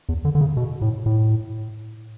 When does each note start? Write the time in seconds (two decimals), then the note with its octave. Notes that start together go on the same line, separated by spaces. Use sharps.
0.09 E2
0.25 D3
0.35 D3
0.41 C#3
0.57 B2
0.82 A2
1.06 A2